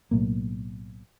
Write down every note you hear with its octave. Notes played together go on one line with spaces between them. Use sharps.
B1 A2 A#3